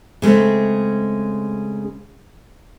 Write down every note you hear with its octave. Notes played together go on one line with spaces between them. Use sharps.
C#3 G#3 A3 C4